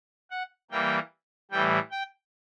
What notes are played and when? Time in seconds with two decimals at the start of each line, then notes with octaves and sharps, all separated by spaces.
0.31 F#5
0.71 E3 G3 A#3 G5
1.51 A2 E3 G3 G5
1.91 G5